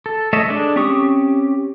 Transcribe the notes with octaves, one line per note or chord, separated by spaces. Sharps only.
A4
A3 A4 C#5 D#5 E5
G#3 D4 A4
C4 C#4 G4 C#6 D#6